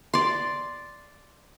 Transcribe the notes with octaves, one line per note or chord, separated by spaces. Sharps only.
D5 C6